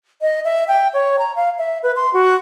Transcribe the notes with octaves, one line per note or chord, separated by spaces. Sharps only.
D#5
E5
G5
C#5
A#5
F5
E5
B4
C6
F#4